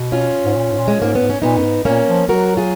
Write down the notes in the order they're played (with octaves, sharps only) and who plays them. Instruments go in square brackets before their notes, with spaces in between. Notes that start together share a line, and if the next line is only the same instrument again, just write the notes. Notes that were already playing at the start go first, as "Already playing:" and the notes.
Already playing: [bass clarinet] B2
[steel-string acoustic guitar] C#4 F4
[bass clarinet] G#2
A#2
G#2
A#2
[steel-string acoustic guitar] G#3
[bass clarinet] G#2 [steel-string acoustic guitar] A#3
[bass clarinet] G#2 [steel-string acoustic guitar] B3
[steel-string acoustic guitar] C#4
[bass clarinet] A#2 [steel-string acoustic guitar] B3 D#4
[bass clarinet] F#2
G#2
[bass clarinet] A#2 [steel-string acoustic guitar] A#3 C#4
[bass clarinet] F3
[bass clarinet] F#3 [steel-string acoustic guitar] F#4 A#4
[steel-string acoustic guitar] F4 G#4